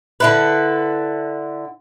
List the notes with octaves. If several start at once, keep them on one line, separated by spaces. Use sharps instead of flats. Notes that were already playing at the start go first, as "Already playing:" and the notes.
D3 E4 B4